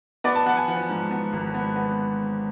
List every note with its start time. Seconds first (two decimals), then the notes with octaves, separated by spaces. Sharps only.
0.24 B3 D5
0.35 A5
0.46 B3 F#5
0.57 G#5
0.68 F3 F#5
0.89 G#2
1.11 B3
1.33 G#1
1.54 B3
1.76 B3